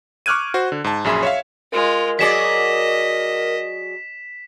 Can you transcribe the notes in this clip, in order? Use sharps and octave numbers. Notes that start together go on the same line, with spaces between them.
C#6 D6 F6 F#6 G#6 D#7
F#4 C5
D3
G#2 A5
A#1 F#2 G#4 E5 B5 C6
C#5 E5 F5
G#3 F4 A#4
F#3 G#4 D5 D#5 B6 E7